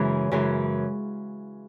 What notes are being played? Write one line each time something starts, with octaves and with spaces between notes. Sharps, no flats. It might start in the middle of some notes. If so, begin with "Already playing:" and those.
Already playing: F#2 C#3 E3 G#3
F#2 C#3 E3 G#3